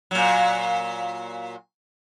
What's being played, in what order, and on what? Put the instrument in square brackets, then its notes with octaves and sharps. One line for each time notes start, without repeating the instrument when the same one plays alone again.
[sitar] A#2 F#3